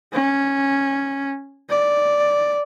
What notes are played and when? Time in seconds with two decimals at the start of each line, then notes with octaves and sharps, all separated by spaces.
0.13 C#4
1.70 D5